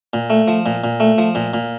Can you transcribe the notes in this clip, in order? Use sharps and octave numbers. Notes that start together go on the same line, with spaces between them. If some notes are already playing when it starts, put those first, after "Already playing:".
A#2
A3
F3
A#2
A#2
A3
F3
A#2
A#2